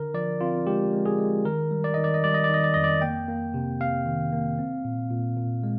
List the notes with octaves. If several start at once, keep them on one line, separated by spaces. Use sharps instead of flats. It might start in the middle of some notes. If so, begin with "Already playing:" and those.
Already playing: D3 A#4
F3 D5
C4 F4
G#3 G4
G#3
G#4
G#3
D#3 A#4
G3
D5
D#3 D#5
D5
D#5
G3 D5
D#5
D5
D#3 D#5
D5
F2 D#5
D5
A#3 G5
A#3
C3
C3 F5
D#3
A#3
C4
A#2
A#2
A#2
G#3